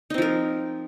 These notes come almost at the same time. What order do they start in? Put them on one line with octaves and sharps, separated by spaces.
D#4 C4 F3 A#4